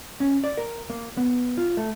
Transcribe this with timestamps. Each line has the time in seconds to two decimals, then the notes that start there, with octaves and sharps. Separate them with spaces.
0.20 C#4
0.44 D5
0.58 A#4
0.90 A#3
1.17 B3
1.58 F4
1.77 A3